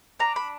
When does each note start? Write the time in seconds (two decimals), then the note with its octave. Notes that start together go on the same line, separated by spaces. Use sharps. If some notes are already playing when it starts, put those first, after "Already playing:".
0.19 D4 A#5
0.36 B5